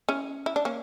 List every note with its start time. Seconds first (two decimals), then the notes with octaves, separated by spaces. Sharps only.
0.09 C#4 E4
0.46 E4
0.56 D4
0.65 A#3 C#4